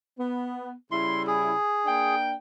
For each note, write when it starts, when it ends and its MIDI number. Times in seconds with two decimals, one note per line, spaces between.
0.18 0.72 59
0.92 1.53 49
0.92 1.53 55
0.92 1.53 64
0.92 1.23 84
1.27 2.15 68
1.86 2.34 58
1.86 2.34 62
1.86 2.34 79